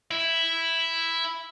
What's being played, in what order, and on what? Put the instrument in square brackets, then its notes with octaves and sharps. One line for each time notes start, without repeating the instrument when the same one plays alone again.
[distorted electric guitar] E4